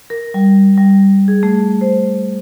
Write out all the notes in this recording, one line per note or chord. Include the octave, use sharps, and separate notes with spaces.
A#4
G3
G3
G#4
A3
C5